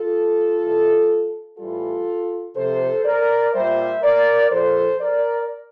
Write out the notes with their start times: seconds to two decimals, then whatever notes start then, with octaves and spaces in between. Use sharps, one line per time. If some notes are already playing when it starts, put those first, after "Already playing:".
Already playing: F4 A4
0.60 C3 E3 G3
1.58 A2 E3 G3 F4 A4
2.56 C3 F3 A4 C5
3.05 A#4 D5
3.53 A#2 G3 C5 E5
4.02 A#4 D5
4.51 A#2 F3 A4 C5
5.00 A#4 D5